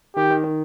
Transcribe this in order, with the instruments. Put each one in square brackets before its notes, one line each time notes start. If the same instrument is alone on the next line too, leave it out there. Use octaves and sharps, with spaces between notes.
[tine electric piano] D#3 [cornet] G4
[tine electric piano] D#3
D#3